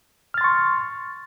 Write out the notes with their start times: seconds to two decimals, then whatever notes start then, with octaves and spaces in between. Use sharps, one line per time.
0.34 F6
0.38 A6
0.41 C6
0.44 C#6